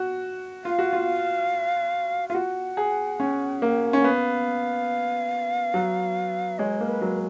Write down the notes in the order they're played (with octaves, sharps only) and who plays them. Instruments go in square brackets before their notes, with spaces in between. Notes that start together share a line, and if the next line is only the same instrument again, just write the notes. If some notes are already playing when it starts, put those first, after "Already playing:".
Already playing: [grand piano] F#4
[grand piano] F4 [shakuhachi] F5
[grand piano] F#4
F4
[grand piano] F4 [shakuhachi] F5
[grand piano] F#4 [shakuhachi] F#5
[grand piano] G#4
C#4
A#3
C#4
[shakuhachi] F#5
[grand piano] B3 [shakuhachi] F5
[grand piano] F#3
[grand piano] G#3 [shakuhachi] C#5
[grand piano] A#3 [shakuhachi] A#4
[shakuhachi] B4
[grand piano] F#3